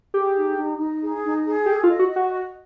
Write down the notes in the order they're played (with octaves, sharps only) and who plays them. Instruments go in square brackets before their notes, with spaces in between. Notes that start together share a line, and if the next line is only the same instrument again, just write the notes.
[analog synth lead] G4 [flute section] G#4
[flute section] D#4
D#4
D#4
G#4
D#4
G#4
[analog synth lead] G4 [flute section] A4
[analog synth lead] F4
[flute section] D#5
[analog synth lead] F#4
[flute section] D#5
[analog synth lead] F#4
[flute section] D#5